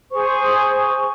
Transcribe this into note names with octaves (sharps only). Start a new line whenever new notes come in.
G#4 C5 C#6